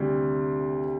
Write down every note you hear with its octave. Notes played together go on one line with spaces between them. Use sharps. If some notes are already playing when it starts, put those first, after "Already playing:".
Already playing: D2 C3 G3